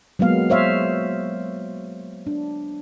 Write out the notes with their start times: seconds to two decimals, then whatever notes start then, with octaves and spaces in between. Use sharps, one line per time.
0.19 F#3 G#3 A#3 B3 F5
0.50 C5 C#5 E5 F5
2.27 D4